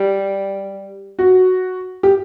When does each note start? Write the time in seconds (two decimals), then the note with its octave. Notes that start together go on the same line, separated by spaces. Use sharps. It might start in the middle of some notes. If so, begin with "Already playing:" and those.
Already playing: G3
1.19 F#4
2.03 G4